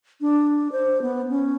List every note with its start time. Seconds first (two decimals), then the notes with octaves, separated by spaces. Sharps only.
0.21 D4
0.72 C5
1.02 B3
1.30 C#4